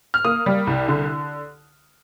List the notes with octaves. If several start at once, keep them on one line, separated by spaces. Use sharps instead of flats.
F6
A#3 D#6
G3
C2
D3